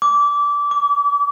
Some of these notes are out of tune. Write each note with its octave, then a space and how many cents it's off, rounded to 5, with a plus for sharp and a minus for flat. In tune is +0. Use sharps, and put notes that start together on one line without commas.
D6 -20
D6 -40